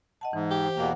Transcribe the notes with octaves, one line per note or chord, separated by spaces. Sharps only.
D#5 F#5 A5
G#2 E3
G4
C5 G5
E2 B2 A#3 F5 F#5